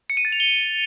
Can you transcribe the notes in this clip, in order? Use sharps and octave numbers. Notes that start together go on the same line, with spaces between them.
C#7
D#7
A6
F7
G7